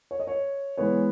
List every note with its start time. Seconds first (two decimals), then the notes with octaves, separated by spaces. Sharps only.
0.11 C#5
0.20 D#5
0.27 C#5
0.77 E3 G#3 B3 C#5